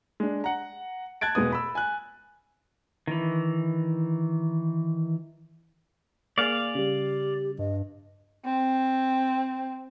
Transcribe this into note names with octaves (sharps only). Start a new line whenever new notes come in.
G#3 D4
F#5 A#5
A5 F#6 G#6 A6 D7
E1 G#3 B3 D#6
B5 E6
G#5 F#6
D#3 E3
A#3 G#4 D5 F5
C#3 G3 G4
G2 D#5
C4